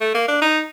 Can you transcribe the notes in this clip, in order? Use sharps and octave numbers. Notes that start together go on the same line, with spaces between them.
A3
A#3
D4
D#4